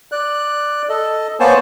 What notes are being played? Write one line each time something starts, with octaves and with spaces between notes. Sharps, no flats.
D5 F#6
A4 D#5
A#3 B3 C5 C#5 G#5 A5